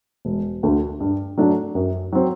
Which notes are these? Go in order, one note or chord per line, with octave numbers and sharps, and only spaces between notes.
E1
D2 D3
G2
F#3 A3 D4
F#2
F#3 C4